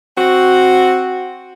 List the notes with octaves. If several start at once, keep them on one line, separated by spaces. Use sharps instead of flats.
C4 F#4